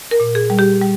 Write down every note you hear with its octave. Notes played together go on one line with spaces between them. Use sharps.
A#4
A#2
G#4
G3
G4
G3